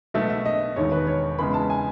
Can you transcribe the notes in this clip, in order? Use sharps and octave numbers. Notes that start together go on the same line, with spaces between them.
B1 B2 A3 E5
E5
D#5
E1 D#2 D#3 C#5
B4
C#5
E2 C#3 G#3 B3 D#4 B5
A5
G#5